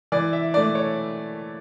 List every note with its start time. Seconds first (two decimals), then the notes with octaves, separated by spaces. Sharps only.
0.12 E3 D5
0.33 E5
0.54 A3 D4 D5
0.75 C#5